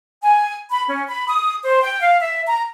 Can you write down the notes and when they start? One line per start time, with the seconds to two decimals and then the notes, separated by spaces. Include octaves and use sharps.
0.22 G#5
0.70 B5
0.88 C#4
1.08 B5
1.28 D#6
1.64 C5
1.84 G5
2.02 F5
2.20 E5
2.47 A#5